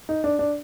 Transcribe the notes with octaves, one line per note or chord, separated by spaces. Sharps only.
D#4
D4
D4